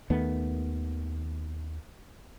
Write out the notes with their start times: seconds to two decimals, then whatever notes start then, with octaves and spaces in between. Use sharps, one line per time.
0.10 D#2 D#3 A3 B3